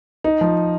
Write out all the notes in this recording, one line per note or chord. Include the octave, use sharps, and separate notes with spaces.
D#4
F3